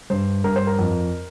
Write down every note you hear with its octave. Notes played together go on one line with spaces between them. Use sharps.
G2 C5
G2 A#4
C5
A#4
F2